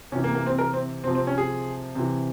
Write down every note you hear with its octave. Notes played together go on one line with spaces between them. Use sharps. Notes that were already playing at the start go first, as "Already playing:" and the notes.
C3 E3 C#4
A#3
A#3
C4
A#4
C4
C3 F3 C4
C4
C#4
G#4
C3 E3